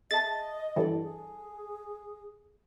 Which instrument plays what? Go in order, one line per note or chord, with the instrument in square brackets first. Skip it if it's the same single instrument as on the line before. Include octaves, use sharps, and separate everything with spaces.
[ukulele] G#4 E5 A5 [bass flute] D#5 [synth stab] A6
[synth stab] G2 E3 [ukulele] A4 D5
[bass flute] G#4